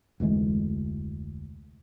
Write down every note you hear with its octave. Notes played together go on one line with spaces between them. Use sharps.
F1 D2 E3 G#3